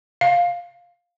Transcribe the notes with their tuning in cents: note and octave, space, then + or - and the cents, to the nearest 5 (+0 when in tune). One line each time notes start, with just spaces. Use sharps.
F5 +10